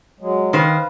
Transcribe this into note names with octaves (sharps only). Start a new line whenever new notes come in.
F#3 G#3
D#3 B4 C5 F5